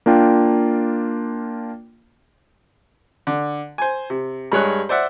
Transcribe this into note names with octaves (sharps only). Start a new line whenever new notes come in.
A#3 D4 F4 G5
D3
C5 G#5
C3
G2 G#3 C#5 F#6
C5 D5 E5 F#5